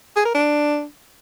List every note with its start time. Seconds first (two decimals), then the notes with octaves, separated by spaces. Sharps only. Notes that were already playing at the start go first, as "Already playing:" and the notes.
0.16 G#4
0.25 A#4
0.35 D4